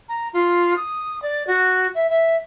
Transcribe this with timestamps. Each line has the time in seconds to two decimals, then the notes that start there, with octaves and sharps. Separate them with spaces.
0.09 A#5
0.33 F4
0.76 D#6
1.22 D5
1.47 F#4
1.94 E5
2.10 E5